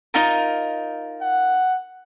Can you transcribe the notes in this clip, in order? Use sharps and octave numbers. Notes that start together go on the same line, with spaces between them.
D#4 F4 A#4
F#5